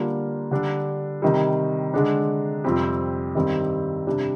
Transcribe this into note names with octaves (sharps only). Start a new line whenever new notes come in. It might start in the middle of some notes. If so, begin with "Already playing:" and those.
Already playing: D3 G3 A#3 D4 F4
D3 G3 D4
C3 D#3 G3
D3 G#3 D4
F2 C3 G3 C4 G4
G2 D#3 G3 C4 G4
C3 G3 D4